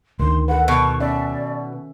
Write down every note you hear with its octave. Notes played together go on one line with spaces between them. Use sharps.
D2 D#3 C6
A4 B4 F#5
B2 C#6
C#4 D5 E5